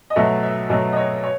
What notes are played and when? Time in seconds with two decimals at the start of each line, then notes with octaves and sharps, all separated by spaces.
0.10 D#5
0.16 B1 B2 F#3 A3 E5
0.43 E5
0.69 B1 B2 F#3 A3 D#5
0.93 D#5
0.96 C#5
1.23 C#5